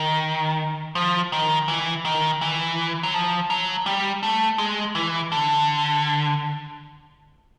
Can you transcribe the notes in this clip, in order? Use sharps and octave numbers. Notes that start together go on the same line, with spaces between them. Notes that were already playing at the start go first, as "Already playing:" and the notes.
Already playing: D#3
F3
D#3
E3
D#3
E3
F#3
F3
F#3
G3
A3
G#3
E3
D3